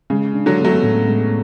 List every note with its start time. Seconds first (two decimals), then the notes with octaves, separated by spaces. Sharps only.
0.10 C#3 G#3
0.34 D4
0.46 D3 F#3
0.59 B3
0.64 F#3 A3
0.83 A2
1.07 G#3